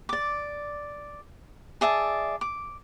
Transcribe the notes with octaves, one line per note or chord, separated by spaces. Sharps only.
D5 D6
G#4 D5 E5 A5
D6